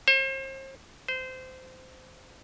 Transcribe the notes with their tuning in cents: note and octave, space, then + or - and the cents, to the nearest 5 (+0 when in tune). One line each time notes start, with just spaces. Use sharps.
C5 +40
C5 -20